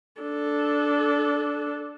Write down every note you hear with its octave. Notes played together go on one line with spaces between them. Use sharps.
D4 A4